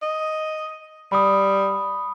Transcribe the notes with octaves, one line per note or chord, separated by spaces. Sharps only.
D#5
G3 B5 D#6